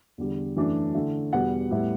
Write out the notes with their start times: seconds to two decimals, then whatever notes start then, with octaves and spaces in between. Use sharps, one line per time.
0.18 E2 D3 G3
0.56 F#2 E3 A3 D4
0.95 D3 A3 E4
1.33 E2 B2 G3 B3 F#5
1.71 A2 G3 B3 E4